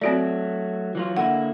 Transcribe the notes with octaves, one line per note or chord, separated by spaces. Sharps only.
F#3 A3 C4 F#4 D5
E3 F#3 F4
D3 A#3 E4 F#5